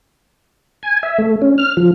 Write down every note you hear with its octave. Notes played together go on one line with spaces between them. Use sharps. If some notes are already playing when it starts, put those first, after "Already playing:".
G#5
E5
A3
C#4
F6
F3